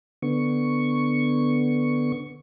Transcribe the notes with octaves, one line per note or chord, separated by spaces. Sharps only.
D3 B3 C#6